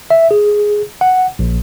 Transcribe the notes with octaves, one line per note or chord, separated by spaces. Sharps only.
E5
G#4
F#5
A#1